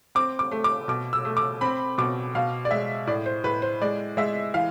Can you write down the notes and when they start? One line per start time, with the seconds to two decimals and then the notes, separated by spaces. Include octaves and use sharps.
0.15 C4 D6
0.39 D6
0.52 A3
0.64 D6
0.88 B2 D6
1.13 E6
1.25 A3
1.37 D6
1.61 C4 B5
1.98 B2 D6
2.35 B2 F5
2.65 D5
2.71 G#3 E5
3.07 A2 D5
3.26 C5
3.44 A2 B4
3.62 C5
3.82 G#3 D5
4.17 G#3 E5
4.54 E3 F5